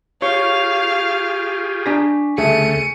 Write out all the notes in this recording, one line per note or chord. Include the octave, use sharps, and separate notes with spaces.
F4 G4 G#4 C#5 F5 C#6
D4 G#5 A#5 B6
D2 C#3 A3 G#4 A4 E5 C#7 D#7